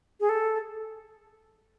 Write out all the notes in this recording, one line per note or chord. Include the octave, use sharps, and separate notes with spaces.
G#4
A4